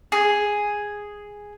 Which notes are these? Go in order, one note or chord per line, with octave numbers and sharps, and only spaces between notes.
G#4